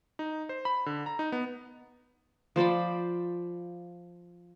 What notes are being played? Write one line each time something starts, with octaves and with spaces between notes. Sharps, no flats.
D#4
C5
B5
D3
A#5
D#4
B3
F3 C5 D5 B5